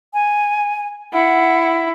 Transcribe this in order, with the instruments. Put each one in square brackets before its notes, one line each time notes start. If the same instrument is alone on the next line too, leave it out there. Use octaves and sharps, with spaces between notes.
[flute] G#5
[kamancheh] E4 [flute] F#5